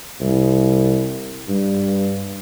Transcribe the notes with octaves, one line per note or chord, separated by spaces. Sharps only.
C2
G2